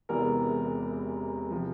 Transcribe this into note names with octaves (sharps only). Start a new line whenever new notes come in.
E1 E2 C3 E3 A#4
C3 F3